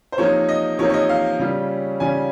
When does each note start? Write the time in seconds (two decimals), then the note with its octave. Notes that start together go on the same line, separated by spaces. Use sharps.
0.12 C5
0.18 C3 F3 A#3 D#4 C#5
0.48 D#5
0.79 C3 F3 A#3 D#4 C#5
0.90 C#5
0.94 D#5
1.09 F5
1.39 C#3 G3 C#4 F4
2.00 C#3 G3 C#4 F4 G#5